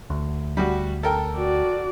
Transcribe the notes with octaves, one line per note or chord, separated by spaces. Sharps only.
D2
G3 F#4
A4 A#4 G5
F#4 D5